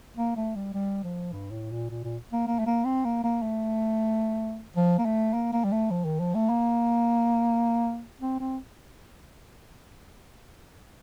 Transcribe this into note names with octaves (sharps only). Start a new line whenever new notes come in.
A#3
A3
G3
G3
F3
G2
A2
A#2
A#2
A#2
A#3
A#3
A3
A#3
C4
A#3
A#3
A3
F3
A#3
A3
A#3
A#3
G3
A3
F3
D#3
F3
A3
A#3
C4
C4